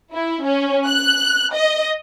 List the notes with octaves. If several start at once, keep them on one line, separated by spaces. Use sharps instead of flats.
E4
C#4
F#6
D#5